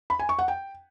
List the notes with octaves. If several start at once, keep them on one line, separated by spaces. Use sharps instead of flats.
B5
G#5
C#6
F#5
G5